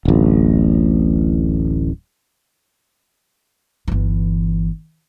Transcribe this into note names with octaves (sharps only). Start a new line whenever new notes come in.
D1 A1
G1 E3